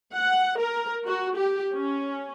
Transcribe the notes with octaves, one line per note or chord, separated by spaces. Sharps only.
F#5
A#4
F#4
G4
C#4